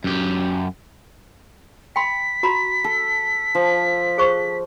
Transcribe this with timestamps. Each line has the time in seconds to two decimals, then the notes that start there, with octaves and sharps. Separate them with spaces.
0.04 F#2 G4
1.96 G5 B5 C6 B6
2.43 F#4 A#5 B5
2.84 A4
3.55 F3
4.18 G#4 C5 C#6